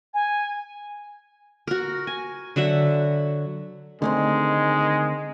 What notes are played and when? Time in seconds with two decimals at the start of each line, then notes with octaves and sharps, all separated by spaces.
0.14 G#5
1.67 F#4 A#4
2.07 G#5
2.56 D3 F#3 E5 F#5
4.02 D3 D#3 G#3 A3 C4